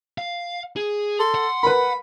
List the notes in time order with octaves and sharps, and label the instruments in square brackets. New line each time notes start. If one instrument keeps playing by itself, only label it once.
[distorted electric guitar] F5
G#4
[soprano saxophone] A4 [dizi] C6
[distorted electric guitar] F#5
[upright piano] A#4 B4 [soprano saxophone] B5